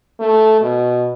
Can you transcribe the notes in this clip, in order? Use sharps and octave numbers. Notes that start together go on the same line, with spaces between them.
A3
B2